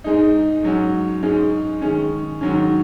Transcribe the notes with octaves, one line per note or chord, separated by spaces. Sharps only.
G#2 G#3 D#4
G#2 F#3 C#4
G#2 G#3 C#4
D#3 G#3 C#4
G#2 D#3 F#3 C#4